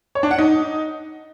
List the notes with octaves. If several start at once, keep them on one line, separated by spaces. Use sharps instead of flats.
C#5
D4
F#5
D#4